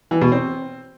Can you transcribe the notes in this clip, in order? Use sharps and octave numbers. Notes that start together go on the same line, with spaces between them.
E3
B2
C4